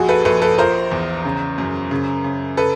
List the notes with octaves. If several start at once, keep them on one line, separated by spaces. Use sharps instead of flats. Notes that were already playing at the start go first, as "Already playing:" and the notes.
Already playing: A#1 F#4 G#4
A4 B4
A#1 A4 B4
A4 B4
F3 A#4 C5
E2
C#3
F#2
C#3
C#3
A4 B4